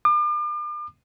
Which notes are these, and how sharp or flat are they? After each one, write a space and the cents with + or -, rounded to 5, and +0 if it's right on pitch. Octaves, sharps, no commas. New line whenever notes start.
D6 +40